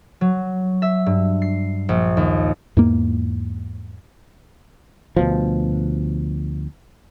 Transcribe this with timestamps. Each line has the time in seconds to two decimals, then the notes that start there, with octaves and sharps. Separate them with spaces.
0.21 F#3
0.82 E5
1.06 G2
1.42 C7
1.89 A#1
2.17 D#2
2.77 E2 G#2 A#3
5.17 D2 B2 F3